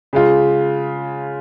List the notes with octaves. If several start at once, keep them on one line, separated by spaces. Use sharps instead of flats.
C#3 G#3 F4